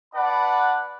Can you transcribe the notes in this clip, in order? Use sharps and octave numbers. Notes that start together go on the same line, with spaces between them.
D4 B4 D5 F#5 B5